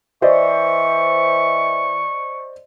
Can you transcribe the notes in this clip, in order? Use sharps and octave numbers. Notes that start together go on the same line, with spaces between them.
E3 C5 D5 D#5 C#6